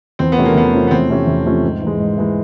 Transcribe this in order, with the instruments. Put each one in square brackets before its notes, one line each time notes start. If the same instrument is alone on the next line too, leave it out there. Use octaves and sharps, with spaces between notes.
[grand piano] E2 [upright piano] C4
[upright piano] B3
[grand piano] C3 F3 A3 C#4
[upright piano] A#3
[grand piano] E2 [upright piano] B3
[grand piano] C3 F3 A3 C#4
[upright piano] B3
[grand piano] E2 [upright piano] C4
[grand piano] C3 F3 A3 C#4
E2
C3 F3 A3 C#4
G#2
E3 G#3
G#2
E3 G#3